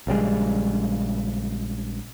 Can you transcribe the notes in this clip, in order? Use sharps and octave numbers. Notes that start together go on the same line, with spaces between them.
A#1 C#3 G3 G#3